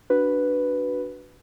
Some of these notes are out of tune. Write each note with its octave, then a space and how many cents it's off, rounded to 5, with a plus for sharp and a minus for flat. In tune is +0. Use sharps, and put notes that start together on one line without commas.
D4 +0 F#4 +10 B4 +0